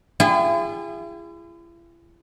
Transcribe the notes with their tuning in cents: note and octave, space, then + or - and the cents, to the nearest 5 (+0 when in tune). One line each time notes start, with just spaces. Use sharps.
E4 +45 G#4 -30